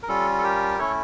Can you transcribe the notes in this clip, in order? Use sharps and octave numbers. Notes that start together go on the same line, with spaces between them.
A#4
G3 C#4 F4 A4
A4
G4 A#4
A3 C#4 E4 A4 C#5